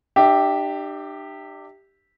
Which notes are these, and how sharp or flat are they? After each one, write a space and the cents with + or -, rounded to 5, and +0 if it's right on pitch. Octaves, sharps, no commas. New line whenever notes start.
D4 +45 G4 +0 E5 +0